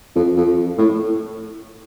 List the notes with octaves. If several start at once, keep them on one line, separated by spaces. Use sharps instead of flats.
F2
F2
A2